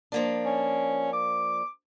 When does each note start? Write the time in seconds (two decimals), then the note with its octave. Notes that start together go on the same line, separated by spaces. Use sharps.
0.12 F3 A#3 D4
0.45 C#4
1.13 D6